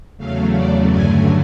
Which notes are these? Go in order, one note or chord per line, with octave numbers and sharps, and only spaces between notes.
E2 C#3 F#3 A3 F5
D5
G2 D3 F#3 A3 G#5